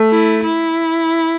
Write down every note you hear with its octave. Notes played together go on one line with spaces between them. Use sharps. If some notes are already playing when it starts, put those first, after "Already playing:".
Already playing: A3
E4
E4